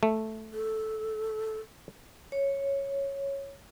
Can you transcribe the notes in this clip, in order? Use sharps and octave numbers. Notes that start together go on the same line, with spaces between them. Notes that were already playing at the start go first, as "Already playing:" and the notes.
A3
A4
C#5